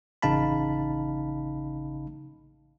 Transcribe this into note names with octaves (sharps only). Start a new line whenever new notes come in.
A1 C#3 D#4 F5 A5 B5